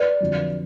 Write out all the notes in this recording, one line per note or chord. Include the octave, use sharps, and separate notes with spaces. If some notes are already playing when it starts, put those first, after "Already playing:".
Already playing: B4 D5
F2 D3 F#3